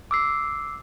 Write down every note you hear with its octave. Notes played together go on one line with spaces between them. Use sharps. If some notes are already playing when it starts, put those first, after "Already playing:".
D6 E6 C7